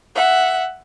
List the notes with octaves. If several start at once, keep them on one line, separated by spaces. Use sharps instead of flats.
E5 F#5